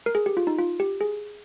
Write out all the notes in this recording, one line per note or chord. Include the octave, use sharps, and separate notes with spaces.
A#4
G#4
G4
F4
D#4
F4
G4
G#4